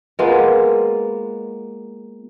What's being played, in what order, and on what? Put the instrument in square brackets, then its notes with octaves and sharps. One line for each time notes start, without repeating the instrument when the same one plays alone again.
[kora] G#3 A#3 B3 F4